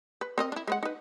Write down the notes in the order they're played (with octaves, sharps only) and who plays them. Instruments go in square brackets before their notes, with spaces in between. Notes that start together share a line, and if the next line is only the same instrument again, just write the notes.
[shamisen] B4
C4 A#4 D#5
D4 E4
G#3 B4 F#5
D#4 B4